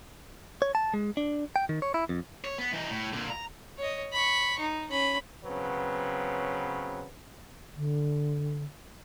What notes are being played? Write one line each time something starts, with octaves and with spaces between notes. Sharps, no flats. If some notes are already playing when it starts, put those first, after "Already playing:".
C#5
A5
G#3
D4
G5
D#3
C#5
E4
F2
C#5
B3
E3 D#4
A2
A#2 D3
A#5
C#5 D#5
B5 C#6
D#4
C#4 B5
C#3 F#3 B3 C4 B4
D3